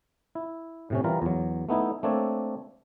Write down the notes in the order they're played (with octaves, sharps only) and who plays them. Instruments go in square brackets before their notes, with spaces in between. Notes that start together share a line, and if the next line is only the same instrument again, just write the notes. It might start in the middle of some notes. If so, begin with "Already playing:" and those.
[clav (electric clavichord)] E4
A2 C3 C#4
E3 G3 F4 A#4 A#5
E2 F#3
A3 B3 D#4 E4
A3 A#3 C4 D4 A4 C#5